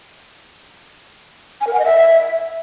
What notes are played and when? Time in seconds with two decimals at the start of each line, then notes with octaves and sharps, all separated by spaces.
1.61 G#5
1.67 A#4
1.73 F#5
1.79 D#5
1.85 E5